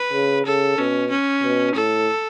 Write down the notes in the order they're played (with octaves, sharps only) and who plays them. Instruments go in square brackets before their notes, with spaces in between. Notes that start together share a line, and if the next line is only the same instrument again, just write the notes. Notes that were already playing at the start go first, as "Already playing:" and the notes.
Already playing: [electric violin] B4
[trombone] C#3
[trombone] C#3 [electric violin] A4
[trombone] B2 [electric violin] C#4
[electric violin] C#4
[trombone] B2
[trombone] A2 [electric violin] A4